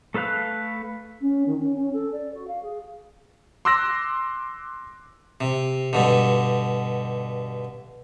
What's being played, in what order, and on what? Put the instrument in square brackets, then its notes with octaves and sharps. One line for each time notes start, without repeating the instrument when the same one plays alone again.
[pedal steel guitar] A3 A4 B4 F5 F#6
[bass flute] C#4
D#3
C#4
C#4
A4
D5
F#4
F5
G#4
[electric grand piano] C6 D6 E6 F#6 A#6
[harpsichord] C3
G2 B2 D3